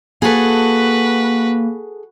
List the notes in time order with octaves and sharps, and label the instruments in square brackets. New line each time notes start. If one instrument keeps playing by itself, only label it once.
[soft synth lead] A#3 [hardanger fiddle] F#4 B4 [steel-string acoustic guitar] G#4 A4